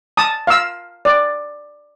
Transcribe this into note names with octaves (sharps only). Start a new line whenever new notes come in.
A5 D#6
F5 E6
D5